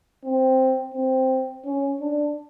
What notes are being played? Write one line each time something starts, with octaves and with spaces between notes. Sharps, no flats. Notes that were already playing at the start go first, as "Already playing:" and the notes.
C4
C4
C#4
D4